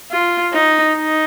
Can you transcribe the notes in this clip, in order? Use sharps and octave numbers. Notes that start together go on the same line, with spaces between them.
F4
D#4
D#4